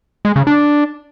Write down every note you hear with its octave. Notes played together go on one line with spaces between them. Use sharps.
G#3
C#3
D4